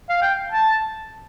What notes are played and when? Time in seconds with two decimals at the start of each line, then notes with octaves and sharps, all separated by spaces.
0.09 F5
0.22 G5
0.52 A5